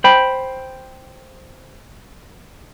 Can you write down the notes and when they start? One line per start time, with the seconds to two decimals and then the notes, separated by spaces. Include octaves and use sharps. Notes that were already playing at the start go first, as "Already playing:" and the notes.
0.04 C5 G5 B5